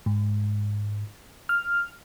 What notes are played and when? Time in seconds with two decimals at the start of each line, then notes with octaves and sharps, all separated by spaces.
0.06 G#2
1.49 F6